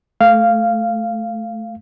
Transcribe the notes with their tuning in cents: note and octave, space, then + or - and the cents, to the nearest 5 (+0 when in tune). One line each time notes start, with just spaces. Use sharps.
A3 -10 F5 -10